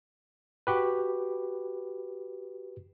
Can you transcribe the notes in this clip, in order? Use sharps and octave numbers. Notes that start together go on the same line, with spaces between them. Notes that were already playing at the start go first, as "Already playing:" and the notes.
F#4 G4 B4